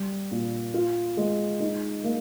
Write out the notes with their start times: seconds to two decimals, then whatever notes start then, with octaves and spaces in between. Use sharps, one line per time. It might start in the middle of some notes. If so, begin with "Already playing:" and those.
Already playing: G3
0.31 A#2
0.74 F4
1.17 G#3
1.60 D#4
2.04 A#3